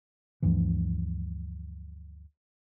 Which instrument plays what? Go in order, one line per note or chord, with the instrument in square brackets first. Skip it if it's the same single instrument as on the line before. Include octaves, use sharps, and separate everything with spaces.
[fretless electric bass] D2 G2 E3 F3